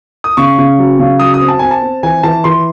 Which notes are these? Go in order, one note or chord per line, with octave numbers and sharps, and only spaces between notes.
D#6
C#3 C#6
C#3
F#3
C#3
F#3 D#6
D#6
C4
A5
C4 G#5
A5
C4
E3 G#5
E3 A5
E3 C6